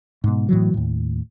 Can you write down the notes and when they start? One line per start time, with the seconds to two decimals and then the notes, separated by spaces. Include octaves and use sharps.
0.24 G#2 B2
0.49 A2 E3 F#3
0.74 D#2 A2